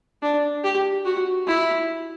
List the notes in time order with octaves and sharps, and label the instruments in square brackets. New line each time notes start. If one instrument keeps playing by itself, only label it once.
[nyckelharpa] D4
G4
F#4
E4